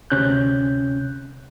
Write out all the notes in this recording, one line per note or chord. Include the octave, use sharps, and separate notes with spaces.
D2 C3 C#4 F#6 G6